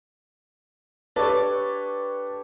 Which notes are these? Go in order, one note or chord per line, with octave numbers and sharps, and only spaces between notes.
D4 G4 A4 B4 C#5 D5